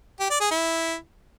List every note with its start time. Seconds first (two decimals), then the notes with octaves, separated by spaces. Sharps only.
0.20 G4
0.30 D5
0.41 G#4
0.51 E4